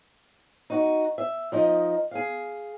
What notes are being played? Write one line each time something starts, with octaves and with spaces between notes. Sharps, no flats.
D#4 F#4
E5
F3 D#4 D#5
G#4 F5